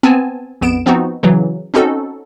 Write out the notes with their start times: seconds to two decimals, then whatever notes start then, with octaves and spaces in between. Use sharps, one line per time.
0.03 B3 C4 G#5 A5
0.61 A#1 F2 B3 D7 E7
0.86 F3 B3 C4 D#4 F#4
1.23 C#3 E3 F#3
1.74 C4 C#4 D#4 F#4 A4